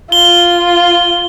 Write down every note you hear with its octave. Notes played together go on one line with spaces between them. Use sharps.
F4 G7